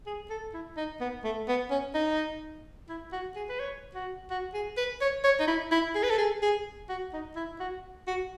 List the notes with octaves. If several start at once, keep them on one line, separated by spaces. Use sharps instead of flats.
G#4
A4
E4
D#4
B3
A3
B3
C#4
D#4
E4
F#4
G#4
B4
C#5
F#4
F#4
G#4
B4
C#5
C#5
D#4
E4
E4
G#4
B4
A4
G#4
G#4
F#4
D#4
E4
F#4
F#4